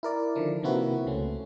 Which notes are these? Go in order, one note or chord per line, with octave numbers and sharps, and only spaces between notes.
E4 A#4 D5
D3 D#3 F3 D4
C3 A#3 C4 E4 F#4 B4
C#2 C#3 A3 C#4